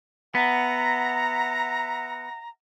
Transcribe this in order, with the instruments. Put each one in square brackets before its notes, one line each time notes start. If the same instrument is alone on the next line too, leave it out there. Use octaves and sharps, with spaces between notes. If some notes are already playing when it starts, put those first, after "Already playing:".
[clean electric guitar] B3 [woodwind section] E5 F#5 A#5